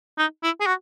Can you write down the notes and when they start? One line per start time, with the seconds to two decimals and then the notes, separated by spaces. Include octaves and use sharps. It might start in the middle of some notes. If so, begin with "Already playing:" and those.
0.18 D#4
0.43 E4
0.60 G#4
0.66 F#4